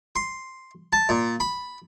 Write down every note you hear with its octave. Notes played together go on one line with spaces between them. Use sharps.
C6
A5
A#2
B5